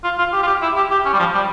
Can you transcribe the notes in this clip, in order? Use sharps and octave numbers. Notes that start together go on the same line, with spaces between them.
F4
F4
G4
F4
G4
E4
G4
G4
C#4
G3
F3
G3